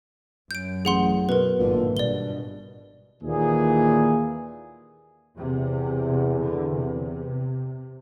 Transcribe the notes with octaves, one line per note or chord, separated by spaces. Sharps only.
F#2 G6 D7
A1 G#4 F#5 C6
B2 A#4 B4
G#1 A#2 D3
G2 B2 D5 G7
D#2 A#2 E3 G#4
E2 C3
D3
C3